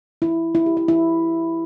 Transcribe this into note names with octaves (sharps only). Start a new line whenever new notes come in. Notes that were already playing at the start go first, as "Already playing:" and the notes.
E4
E4
G4
E4
E4